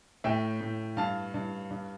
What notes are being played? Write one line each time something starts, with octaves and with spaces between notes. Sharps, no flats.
A2 E5 G5
A2
G2 F5 A5
G2
G2